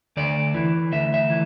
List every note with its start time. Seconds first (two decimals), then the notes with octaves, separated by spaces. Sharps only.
0.17 D2 D5
0.55 E3
0.92 D2 E5
1.14 E5
1.30 E3